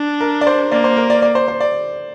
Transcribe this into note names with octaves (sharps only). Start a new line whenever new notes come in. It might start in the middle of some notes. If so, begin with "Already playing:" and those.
Already playing: D4
A#4
D5
C5
A#3 D5
C5
A#4
D5
D5
C5
C5
D5